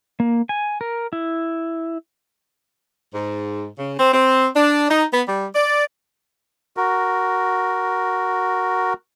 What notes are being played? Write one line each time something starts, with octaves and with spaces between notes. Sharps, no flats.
A#3
G#5
A#4
E4
G#2
C#3
C4
C4
D4
D#4
B3
G3
D5
F#4 A#4